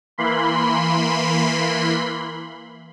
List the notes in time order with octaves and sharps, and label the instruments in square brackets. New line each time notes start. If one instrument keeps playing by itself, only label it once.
[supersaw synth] E3 A#3 B5 C6